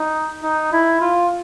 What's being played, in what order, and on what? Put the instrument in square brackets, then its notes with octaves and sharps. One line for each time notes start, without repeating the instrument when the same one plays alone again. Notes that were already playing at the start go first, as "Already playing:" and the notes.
Already playing: [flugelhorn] D#4
D#4
E4
F4